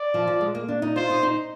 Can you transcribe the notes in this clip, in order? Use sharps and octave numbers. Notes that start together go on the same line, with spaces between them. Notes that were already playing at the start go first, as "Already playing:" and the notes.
Already playing: D5
F3
F3
G#3
A#3
D4
D#4
F4 C5
D#4
D#4